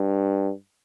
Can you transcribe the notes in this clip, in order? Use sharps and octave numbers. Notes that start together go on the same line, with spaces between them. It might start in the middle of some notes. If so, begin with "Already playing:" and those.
Already playing: G2